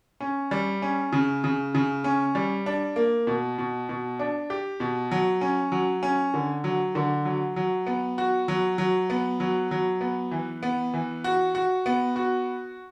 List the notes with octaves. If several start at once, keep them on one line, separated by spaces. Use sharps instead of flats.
C#4
G3
C#4
C#3
C#3
C#3
C#4
G3
D4
A#3
B2
B2
B2
D4
G4
B2
F#3
C#4
F#3
C#4
D3
F#3
D3
F#3
F#3
B3
F#4
F#3
F#3
B3
F#3
F#3
B3
E3
B3
E3
F#4
F#4
B3
F#4